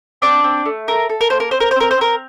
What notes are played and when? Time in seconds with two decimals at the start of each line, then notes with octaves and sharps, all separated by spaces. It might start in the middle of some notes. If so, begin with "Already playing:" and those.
0.22 C4 D4 D5
0.44 C4
0.65 A3
0.88 A4 A#4
1.10 A4
1.21 A#4
1.30 A#3 C5
1.40 A#4
1.51 C4 C5
1.60 A#4
1.71 C5
1.76 C4 A#4
1.91 C5
1.98 C4 A#4